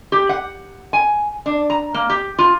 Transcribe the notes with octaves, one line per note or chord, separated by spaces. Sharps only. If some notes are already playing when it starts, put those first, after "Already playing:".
G4
F#5
G#5
D4
A#5
A#3
G4
F4